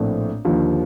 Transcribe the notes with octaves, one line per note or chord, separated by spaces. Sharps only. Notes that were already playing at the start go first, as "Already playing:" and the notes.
Already playing: A#1 A2 A3 C4
D#2 D3 F3